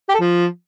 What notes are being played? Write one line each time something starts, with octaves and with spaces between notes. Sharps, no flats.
G4
A4
F3